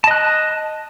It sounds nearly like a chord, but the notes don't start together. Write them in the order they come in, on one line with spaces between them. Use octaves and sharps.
A5 D#5 F#6